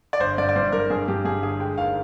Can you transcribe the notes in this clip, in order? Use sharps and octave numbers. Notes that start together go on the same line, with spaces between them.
D5
G1 C5
G2 D5
D5
G2 C5
G2 A#4
G2 G#4
G2 G4
G2 G#4
G1 G#4
G#3 G5
D#2 F5